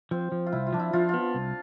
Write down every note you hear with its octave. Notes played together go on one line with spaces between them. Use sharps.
F3 C4
F3
F4
C2 E4
F4
F3 D4
E4
F3 F4
B3 F4
C2